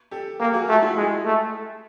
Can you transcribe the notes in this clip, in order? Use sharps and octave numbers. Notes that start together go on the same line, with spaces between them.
G4 A4
A#3 G4 A4
F#4 G#4
A3 F4 G4
E4 F#4
G#3
A3